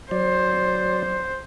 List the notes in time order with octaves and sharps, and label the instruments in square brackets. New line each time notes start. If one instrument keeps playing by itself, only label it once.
[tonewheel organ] F#3 D5 [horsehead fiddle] C5